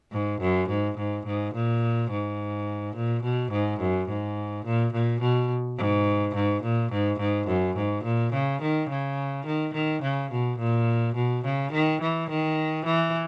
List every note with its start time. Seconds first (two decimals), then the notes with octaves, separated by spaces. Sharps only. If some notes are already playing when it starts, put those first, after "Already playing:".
0.12 G#2
0.41 F#2
0.69 G#2
0.98 G#2
1.26 G#2
1.54 A#2
2.11 G#2
2.96 A#2
3.23 B2
3.51 G#2
3.80 F#2
4.09 G#2
4.66 A#2
4.93 A#2
5.21 B2
5.78 G#2
6.35 G#2
6.63 A#2
6.92 G#2
7.19 G#2
7.47 F#2
7.76 G#2
8.04 A#2
8.33 C#3
8.62 D#3
8.89 C#3
9.46 D#3
9.74 D#3
10.03 C#3
10.32 B2
10.59 A#2
11.15 B2
11.45 C#3
11.72 D#3
12.01 E3
12.30 D#3
12.85 E3